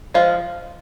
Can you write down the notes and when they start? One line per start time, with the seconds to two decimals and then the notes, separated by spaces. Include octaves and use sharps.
0.14 F3 G#3 F4